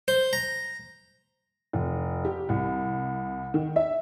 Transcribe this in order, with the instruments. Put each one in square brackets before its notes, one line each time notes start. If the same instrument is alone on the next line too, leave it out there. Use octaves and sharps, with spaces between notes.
[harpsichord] C5
A#5
[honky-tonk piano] F1
G4
C2
D#3
E5